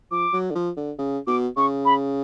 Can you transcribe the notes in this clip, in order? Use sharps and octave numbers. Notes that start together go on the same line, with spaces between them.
F3 D6
F#3
D3
F3
D3
C#3
B2 D6
C#3 C#6
B5